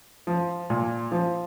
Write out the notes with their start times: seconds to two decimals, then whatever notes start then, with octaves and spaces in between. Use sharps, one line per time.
0.27 F3
0.70 A#2
1.12 F3